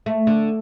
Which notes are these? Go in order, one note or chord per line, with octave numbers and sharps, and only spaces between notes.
A3
D3